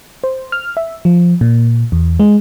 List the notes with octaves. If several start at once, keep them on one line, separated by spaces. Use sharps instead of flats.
C5
F6
E5
F3
A#2
E2
G#3